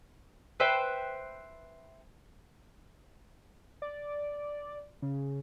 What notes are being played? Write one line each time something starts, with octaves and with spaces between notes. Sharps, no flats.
B4 C5 E5 G5
D5
C#3